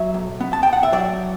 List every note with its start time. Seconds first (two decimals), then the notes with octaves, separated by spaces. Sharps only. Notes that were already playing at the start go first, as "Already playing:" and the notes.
Already playing: F#3 E5
0.14 B1
0.40 B3
0.53 A5
0.63 B2 G5
0.73 F#5
0.83 E5
0.92 F#3 D5